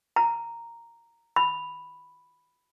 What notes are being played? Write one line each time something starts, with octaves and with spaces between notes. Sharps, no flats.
A#5
B5